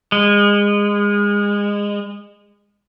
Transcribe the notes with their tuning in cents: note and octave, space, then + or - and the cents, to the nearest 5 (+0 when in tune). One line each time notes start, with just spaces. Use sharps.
G#3 -25